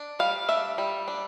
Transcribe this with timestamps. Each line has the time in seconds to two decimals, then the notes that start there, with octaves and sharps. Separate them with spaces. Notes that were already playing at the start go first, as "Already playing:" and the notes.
Already playing: D4
0.19 G3 F5
0.49 D4 E5
0.78 G3
1.08 D4